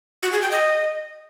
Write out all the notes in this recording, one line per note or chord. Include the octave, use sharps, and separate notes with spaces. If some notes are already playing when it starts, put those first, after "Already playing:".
F#4
G#4
G5
D#5